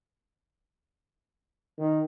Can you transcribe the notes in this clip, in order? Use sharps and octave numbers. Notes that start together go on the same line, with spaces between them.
D#3